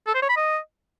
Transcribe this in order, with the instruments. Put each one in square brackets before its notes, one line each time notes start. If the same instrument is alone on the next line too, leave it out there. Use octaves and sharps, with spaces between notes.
[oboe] A4
C5
C#5
B5
D#5